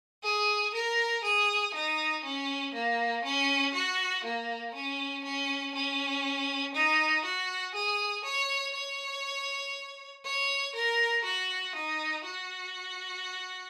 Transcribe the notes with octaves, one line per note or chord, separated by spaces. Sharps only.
G#4
A#4
G#4
D#4
C#4
A#3
C#4
F#4
A#3
C#4
C#4
C#4
D#4
F#4
G#4
C#5
C#5
C#5
A#4
F#4
D#4
F#4